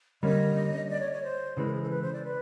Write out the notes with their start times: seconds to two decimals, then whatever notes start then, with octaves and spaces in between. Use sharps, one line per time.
0.23 D3 G3 A#3 C#4 D#5
0.90 D5
1.00 C#5
1.13 C#5
1.23 C5
1.57 C#3 E3 G#3 B4
1.65 A#4
1.73 G#4
1.82 A4
1.89 B4
2.02 C5
2.13 D5
2.23 B4